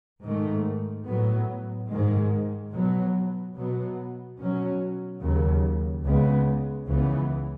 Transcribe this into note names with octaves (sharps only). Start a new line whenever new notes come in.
G#2 D#3 A3
A2 F#3 B3
G#2 D#3 G#3
B2 F#3 B3
B2 F#3 B3
B2 F#3 C#4
D#2 C#3 F#3
C#2 C#3 G#3 B3
C#2 C#3 E3 B3